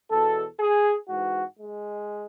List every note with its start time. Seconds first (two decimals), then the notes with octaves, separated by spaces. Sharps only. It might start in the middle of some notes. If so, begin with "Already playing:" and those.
0.10 E2 B2 A4
0.60 G#4
1.08 G#2 E3 F#4
1.58 G#3